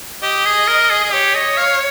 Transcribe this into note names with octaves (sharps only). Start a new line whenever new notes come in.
G4 D#5
G#4
A#4
G#4
G#4
G4 C#5
D#5
F5